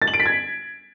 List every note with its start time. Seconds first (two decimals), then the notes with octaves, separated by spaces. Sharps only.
0.02 A6
0.08 F#7
0.14 D7
0.20 B6
0.26 G#6